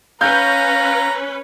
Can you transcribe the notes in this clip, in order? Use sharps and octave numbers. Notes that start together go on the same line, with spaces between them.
C#4 B4 F5 A#5 G6